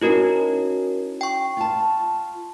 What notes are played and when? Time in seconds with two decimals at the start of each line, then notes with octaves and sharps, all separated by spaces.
0.01 C#4 D#4 E4 F#4 A#4
1.21 G5 C#6
1.57 F4 A5